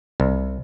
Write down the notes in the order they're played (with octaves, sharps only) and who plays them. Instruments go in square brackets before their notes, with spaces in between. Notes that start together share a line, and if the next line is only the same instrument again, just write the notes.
[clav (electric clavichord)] C2